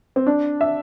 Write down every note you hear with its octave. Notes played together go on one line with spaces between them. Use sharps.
C4
D4
E5